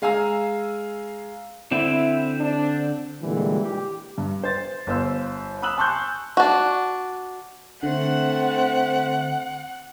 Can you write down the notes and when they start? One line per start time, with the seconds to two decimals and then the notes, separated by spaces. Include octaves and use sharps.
0.02 G#3 F5 G#5 A#5 E6
1.72 D3 C4 E4
2.40 D4
3.23 A#2 D3 E3 G3 G#3
3.62 G4
4.18 G2
4.44 C5 A6
4.87 G1 C5 E6
5.62 B5 D#6 E6 F#6 F#7
5.77 G#5 A5 C6 C#6 F#6 G6
6.37 D4 F#4
7.83 D3 A3 C4 F#5 F#6